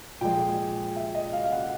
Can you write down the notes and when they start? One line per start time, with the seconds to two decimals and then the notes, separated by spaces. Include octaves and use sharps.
0.21 A#2 F3 G#3 G5
0.96 E5
1.15 D#5
1.33 F5
1.44 F5
1.52 F#5